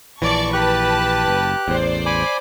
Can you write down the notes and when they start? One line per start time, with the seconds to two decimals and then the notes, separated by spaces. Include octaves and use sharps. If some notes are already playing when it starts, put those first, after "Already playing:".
0.22 A#1 E3 D5 A5 C#6
0.53 G4 B4 A5 F#6
1.28 F#1
1.68 A1 E2 C5 D5
2.06 G#5 B5 D6